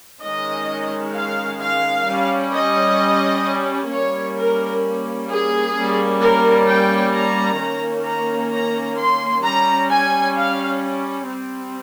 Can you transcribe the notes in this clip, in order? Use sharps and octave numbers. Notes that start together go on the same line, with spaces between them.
D#3 G#3 C#4 D#5
F5
F5
G3 C#4
D#5
G3 A#3 C#4 C#5
A#4
G#4
G3 A#3 C#4
A#4
G5
A#5
D#3 A#3 C#4
A#5
A#5
C6
G3 C#4 A#5
G#5
F5
G3 C4